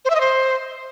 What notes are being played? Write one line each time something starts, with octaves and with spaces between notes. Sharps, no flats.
C5
E5
D#5
C5